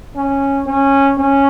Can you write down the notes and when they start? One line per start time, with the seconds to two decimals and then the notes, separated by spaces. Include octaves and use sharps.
0.16 C#4
0.67 C#4
1.18 C#4